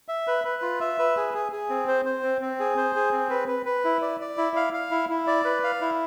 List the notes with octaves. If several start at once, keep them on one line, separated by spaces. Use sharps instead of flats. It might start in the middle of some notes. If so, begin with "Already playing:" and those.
E5
B4
B4
F4
E5
B4
G#4
G#4
G#4
C4
C5
C5
C4
C4
G#4
C5
G#4
C4
B4
B4
B4
E4
D5
D5
E4
F5
F5
E4
E4
D5
B4
F5
E4